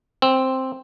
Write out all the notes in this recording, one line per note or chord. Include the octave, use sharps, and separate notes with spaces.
C4